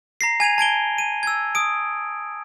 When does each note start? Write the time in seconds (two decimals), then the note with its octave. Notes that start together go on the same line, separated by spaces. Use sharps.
0.21 A#5 A#6 C7
0.40 G#5 G#6 D#7 F7
0.58 A5 G#6 D7 G7
0.98 D#7
1.23 E6 G#6
1.55 D#6 D7